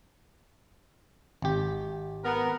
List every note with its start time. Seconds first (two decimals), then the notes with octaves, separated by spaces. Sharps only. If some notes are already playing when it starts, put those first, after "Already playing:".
1.42 G#1 G4
2.24 B3 A#4